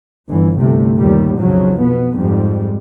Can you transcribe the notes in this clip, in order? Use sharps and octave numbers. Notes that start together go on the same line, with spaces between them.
G1 E3
G1 C2 C3 A3
D#2 A#2 G3
B1 F2 C#3 F3 F#3
B2 B3
F2 G#2 G3